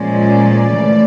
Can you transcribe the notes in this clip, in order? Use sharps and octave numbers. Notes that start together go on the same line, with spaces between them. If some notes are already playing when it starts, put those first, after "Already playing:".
Already playing: A#2 F3 G#3 C#4 D5
C#3 E3 A3